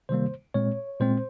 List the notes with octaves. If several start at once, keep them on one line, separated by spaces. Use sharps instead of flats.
C3 D#3 G3 A#3 C5
A#2 G#3 C4 C#5
A#2 G#3 C4 C5